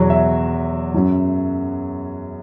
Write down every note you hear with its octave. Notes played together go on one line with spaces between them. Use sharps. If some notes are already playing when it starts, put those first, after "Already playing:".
Already playing: E2 B2 F#3 C#5
E5
F#2 F#3